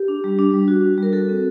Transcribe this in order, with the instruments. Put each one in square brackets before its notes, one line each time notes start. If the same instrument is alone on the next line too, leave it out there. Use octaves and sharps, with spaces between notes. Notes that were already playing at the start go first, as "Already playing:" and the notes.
Already playing: [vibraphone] G4
D4
G3
D4
G3
F#4
D4
G3 A#4
F#4 A4
C4